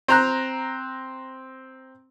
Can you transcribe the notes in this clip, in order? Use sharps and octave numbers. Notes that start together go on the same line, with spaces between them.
C4 A#5 F#6